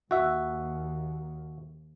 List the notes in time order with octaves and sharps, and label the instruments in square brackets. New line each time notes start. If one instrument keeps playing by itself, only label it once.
[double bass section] D#2 [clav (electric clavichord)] F#4 E5